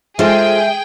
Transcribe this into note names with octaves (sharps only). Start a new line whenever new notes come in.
G#3 F4 G#4 A4 C5 E5 G5